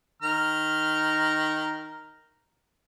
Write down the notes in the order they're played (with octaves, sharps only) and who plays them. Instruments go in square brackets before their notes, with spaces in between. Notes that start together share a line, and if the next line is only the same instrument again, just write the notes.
[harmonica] D#3 A#5 F6